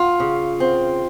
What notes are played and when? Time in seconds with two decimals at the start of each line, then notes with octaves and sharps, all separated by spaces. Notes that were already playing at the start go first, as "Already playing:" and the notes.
Already playing: F4
0.20 C#3
0.60 C4